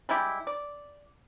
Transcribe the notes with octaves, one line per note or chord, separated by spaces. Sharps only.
G3 G#3 E4 G4
D5